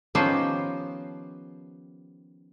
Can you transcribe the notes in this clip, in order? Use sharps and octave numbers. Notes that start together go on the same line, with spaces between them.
D#3 F3 B3 C#4 G4 C5